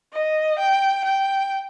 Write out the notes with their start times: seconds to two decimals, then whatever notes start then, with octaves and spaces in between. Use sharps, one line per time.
0.13 D#5
0.59 G5
1.04 G5